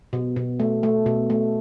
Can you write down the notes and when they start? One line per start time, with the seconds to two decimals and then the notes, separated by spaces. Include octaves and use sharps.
0.13 B2
0.36 B2
0.60 A3
0.83 A3
1.06 B2
1.30 A3